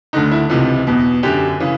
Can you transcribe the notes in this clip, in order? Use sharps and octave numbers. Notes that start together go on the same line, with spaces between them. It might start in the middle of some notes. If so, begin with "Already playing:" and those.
D2 D3 D#4
E4
C#2 C3 E3 F4
E2 B2
F#2 D3 G4
C#3 E3